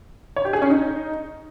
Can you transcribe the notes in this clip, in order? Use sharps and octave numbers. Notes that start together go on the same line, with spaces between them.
C#5
G4
G#4
C#4
D#4